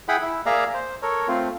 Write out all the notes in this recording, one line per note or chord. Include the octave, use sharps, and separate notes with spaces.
E4 G#4 F#5 G5 B5
E4
A#3 G#4 D5 E5 F5 A#5
C5
A4 A#4 C#5
A3 C4 F4